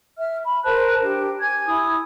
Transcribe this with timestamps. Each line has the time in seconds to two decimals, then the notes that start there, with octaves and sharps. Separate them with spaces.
0.18 E5 F6
0.45 B5
0.64 A#4 C5 A5 F#6
1.01 D4 G4
1.40 G#5 D6 G#6
1.67 E4 D#6